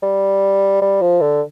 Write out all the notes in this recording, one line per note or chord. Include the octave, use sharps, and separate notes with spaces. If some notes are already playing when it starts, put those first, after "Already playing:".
G3
G3
F3
D3